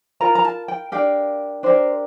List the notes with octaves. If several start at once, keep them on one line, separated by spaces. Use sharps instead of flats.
F4 A#4 A#5
A#5
A5
G5
D4 G4 A#4 F5
D4 G4 A#4 C5